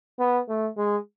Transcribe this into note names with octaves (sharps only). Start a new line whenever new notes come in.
B3
A3
G#3